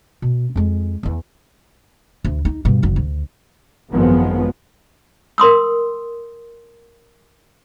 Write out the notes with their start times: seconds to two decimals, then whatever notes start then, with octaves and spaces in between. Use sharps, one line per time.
0.22 B2
0.56 F2 G#3
1.03 E2 E3
2.25 D2
2.45 D#4
2.65 G2 B2
2.83 F#1 F#3
2.96 D2
3.92 G#1 F#2 D#3 F3 G#3 B3
5.38 A#4 C6 D#6 E6